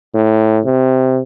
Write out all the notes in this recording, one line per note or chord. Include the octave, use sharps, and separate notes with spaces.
A2
C3